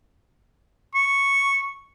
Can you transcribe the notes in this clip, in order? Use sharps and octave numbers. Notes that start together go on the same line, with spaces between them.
C#6